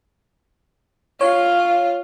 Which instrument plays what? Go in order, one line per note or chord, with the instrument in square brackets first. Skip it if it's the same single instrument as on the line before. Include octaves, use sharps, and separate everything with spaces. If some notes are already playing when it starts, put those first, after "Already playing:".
[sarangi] F4 [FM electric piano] C#5